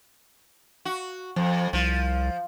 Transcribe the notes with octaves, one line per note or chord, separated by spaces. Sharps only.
F#4
F2 F3
C2 F3